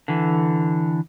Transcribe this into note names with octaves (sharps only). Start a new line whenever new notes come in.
D3 E3